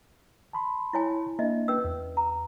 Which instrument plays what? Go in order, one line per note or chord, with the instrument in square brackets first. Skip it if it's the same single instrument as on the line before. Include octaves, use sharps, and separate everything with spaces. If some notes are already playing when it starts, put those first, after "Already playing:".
[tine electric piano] A5 B5 C6
[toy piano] E4 C#5 G#5
[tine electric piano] A#3 D4 [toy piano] D#5 E5
[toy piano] C#4 B4 E6
[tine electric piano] E2
[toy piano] A#5